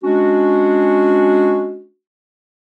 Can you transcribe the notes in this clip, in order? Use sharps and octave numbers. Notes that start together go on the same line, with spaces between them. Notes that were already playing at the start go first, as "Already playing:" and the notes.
G#3 C#4 D4 F#4